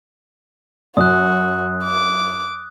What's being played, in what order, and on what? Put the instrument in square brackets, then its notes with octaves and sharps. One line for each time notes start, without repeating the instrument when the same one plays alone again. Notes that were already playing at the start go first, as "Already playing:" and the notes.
[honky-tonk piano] F#2 [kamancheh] F#4 [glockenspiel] D#6 F#6
[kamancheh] D6